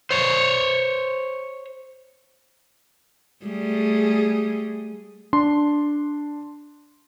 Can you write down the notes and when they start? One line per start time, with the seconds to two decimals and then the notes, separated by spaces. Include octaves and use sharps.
0.11 C5 C#5
3.45 G3 A3 G#4
5.33 D4 C6